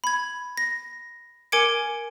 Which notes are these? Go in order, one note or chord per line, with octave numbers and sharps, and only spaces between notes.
B5 G#6
A#6
A#4 G#5 D6 G#6 C#7 D7